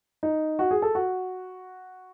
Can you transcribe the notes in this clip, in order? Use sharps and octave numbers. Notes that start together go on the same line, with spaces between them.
D#4
F#4
G#4
A4
F#4